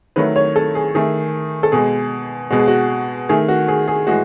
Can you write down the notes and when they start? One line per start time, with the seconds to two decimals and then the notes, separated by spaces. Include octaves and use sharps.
0.16 D#3 F#3 A3 B4
0.36 C#5
0.56 A4
0.75 G#4
0.95 D#3 A3 G#4
1.63 A4
1.72 B2 G#3 G#4
2.51 B2 G#3 F#4
2.59 G#4
2.68 F#4
3.29 D#3 A3 G#4
3.48 F#4
3.68 G#4
3.88 G#4
4.07 A2 E3 G#3 F#4